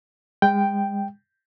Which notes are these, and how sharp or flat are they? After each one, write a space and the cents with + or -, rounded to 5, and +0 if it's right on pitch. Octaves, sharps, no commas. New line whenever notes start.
G#3 -35 G5 +0